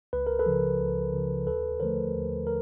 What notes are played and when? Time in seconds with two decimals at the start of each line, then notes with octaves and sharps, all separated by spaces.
0.13 C#2 B4
0.27 A#4
0.39 A4 B4
0.46 C#3 F3
0.80 C#2
1.13 C#3 F3
1.46 D#2 A4 B4
1.80 D3 F3 A3 A#4 C5
2.14 D#2
2.47 A#4